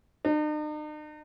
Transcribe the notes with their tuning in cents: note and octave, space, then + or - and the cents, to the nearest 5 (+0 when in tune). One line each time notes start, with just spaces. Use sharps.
D#4 -45